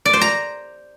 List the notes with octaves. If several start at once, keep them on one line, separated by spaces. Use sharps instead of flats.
D5
C5
A#5